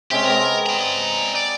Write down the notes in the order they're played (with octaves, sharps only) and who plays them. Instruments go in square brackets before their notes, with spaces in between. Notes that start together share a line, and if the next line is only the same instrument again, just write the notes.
[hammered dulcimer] C3 G#3 C#4 [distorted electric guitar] G4
[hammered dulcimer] G#3 B3 C4 [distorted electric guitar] A#4
[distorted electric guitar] D5 A#5
D5